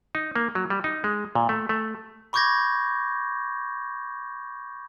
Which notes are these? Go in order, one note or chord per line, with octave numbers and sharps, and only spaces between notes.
D#4
A#3
F#3
G3
D#4
G#3
A#2
A3
A3
B5 C#6 D6 G6 G#6 A#6